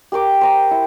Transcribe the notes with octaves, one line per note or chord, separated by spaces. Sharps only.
G4 A#4 G5 D6
C5 A#5 D6
E4